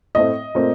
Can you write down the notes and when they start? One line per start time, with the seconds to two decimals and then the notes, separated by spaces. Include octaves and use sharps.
0.15 A2 A3 C4 D#5
0.55 A#2 A3 C4